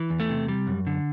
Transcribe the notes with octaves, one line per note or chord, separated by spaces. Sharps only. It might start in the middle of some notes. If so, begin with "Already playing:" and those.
Already playing: E3
E2
A3
C3
G3
F#2
D3